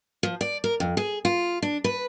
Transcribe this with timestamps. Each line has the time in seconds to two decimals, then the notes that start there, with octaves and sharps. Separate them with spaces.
0.23 F3
0.41 D5
0.64 A#4
0.80 F2
0.97 G#4
1.25 F4
1.62 D4
1.84 B4